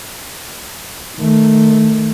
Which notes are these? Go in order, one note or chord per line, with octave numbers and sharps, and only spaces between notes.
D#3 A3